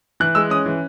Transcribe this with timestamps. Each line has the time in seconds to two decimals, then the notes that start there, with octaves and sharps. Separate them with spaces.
0.20 E3 F#6
0.35 G#3 E6
0.50 C#4 D#6
0.66 E3